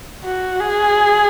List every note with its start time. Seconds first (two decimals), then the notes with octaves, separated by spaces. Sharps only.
0.25 F#4
0.60 G#4